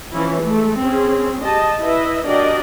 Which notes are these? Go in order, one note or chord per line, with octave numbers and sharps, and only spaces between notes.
E3 F3 C#4 E4
G#3 A3 A4
C4 C#4 G#4
G4 D#5 A5
E4 B4 D#5 E5
D4 F#4 G4 A#4 D5 D#5